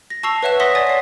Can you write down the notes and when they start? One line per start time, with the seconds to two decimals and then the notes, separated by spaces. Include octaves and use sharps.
0.10 A#6
0.23 A5 C#6 E6 C7 F7
0.43 B4 C#5 E5 F#5 F#6 E7
0.60 F#5 C6 D#6 A#6 B6
0.75 C#5 D5 G#5 A6
0.87 B6 C7